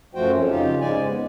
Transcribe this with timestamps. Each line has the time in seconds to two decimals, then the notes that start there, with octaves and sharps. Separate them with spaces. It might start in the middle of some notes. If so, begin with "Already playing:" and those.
0.15 F#2 F3 A3 F#4 C5 G5
0.32 F2 C#4
0.50 C#3 D#4 F4 G4
0.80 G#2 C#3 G#3 D5 G#5
1.07 B3